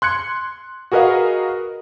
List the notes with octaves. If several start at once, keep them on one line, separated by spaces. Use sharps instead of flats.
C6 F#6 G#6 C#7
F#4 G#4 A#4 B4 D#5 F5